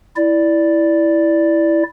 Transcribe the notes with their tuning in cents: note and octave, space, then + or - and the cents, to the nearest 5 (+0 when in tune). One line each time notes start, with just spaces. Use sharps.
E4 +0 D5 +0